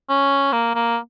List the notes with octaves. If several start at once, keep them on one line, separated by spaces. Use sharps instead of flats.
C#4
A#3
A#3